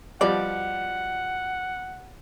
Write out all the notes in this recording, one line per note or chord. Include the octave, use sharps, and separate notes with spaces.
B2 F3 G3 D5 F#5